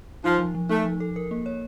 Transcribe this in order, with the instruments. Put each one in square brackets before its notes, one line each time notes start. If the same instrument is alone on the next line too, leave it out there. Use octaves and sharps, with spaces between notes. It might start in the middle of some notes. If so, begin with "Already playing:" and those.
[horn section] F3 [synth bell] D#4
[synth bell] F3
F3
[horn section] A3 [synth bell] D#4
[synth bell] F3
A4
A#4
A#3
C#5